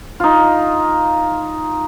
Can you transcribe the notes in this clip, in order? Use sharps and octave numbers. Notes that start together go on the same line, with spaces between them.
D#4 F4